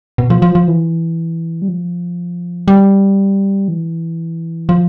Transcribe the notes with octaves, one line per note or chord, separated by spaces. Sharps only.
B2
F3
F3
F3
E3
G3
F3
G3
E3
F3